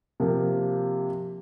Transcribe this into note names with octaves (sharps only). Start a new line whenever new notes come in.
C3 F3 A#3